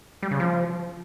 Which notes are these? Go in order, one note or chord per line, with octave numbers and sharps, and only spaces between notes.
G3
C#3
F3